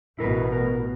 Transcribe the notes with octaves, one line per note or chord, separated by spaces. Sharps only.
A1 B2 E4 A#4 B4
A#4